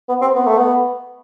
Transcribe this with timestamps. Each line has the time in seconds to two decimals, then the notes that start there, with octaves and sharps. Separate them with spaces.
0.09 B3
0.22 C4
0.35 B3
0.47 A3
0.58 B3